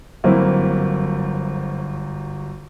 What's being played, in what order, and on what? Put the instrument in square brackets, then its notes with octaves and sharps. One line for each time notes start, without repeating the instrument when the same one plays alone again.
[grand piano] G1 F#2 [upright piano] A#3 C4 E4